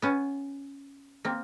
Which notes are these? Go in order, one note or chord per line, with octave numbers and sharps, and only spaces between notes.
B3 C#4
A#3 C4